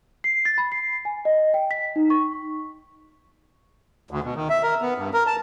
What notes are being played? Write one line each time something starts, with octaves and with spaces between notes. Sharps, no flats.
C7
A6
B5
C7
G#5
D#5
G5
B6
D#4
C#6
D2
B2
D#3
E5
A#4
B3
G2
A#4
A5